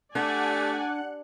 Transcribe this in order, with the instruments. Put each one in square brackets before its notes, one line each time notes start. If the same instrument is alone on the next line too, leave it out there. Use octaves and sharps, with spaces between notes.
[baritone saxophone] A3 [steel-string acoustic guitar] D4 [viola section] G4 D5 G#5 [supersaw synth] F#5 F#6